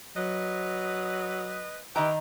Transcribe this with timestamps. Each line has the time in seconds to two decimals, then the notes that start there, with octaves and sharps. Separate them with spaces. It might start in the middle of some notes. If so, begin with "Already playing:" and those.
0.17 F#3 B4 D#5
1.96 D#3 E4 G4 B4 D#5 A#5